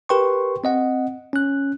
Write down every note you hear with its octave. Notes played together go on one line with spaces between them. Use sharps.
G4 A#4 B4 G5 C6 C#6
C4 D#5 F#5
C#4 F#6